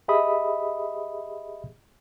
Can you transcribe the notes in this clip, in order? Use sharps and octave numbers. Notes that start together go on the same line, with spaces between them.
G4 G#4 D#5 E5 B5 D#6